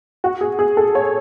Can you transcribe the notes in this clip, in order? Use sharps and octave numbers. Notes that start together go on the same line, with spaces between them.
F#4
G#4
G#4
A4
C#5